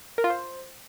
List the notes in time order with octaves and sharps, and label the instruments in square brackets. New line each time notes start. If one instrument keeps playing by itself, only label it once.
[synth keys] A#4
F4
C5